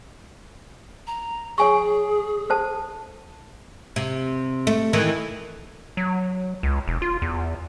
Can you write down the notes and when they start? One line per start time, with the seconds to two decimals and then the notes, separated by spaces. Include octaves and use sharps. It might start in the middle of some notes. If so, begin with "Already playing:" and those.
1.07 A#5
1.58 G#4 C#5 G#5 C#6
2.50 A4 C5 A5
3.96 C3
4.67 A3
4.93 D#3 E3 A3
5.97 F#3
6.63 C#2
6.88 E1
7.02 F4
7.22 E2